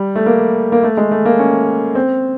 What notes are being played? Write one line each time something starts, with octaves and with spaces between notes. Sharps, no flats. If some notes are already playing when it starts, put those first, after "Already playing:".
Already playing: G3
A3
A#3
A#3
A3
G#3
A3
A#3
C#4
C4